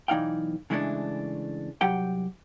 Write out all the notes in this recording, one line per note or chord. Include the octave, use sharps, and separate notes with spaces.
B1 E3 D#4 D5 F5 G5
C#3 E3 G#3 A3 C4 D4
C2 F#3 G4 F#5 G5